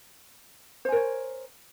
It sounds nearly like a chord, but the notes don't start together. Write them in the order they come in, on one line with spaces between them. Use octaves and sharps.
C5 G#5 A#4 C#5